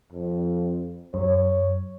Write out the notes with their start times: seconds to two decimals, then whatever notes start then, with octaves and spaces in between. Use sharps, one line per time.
0.13 F2
1.14 F#2 C#5